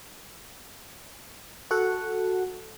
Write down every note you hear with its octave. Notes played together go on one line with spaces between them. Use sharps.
F#4 A4 F#5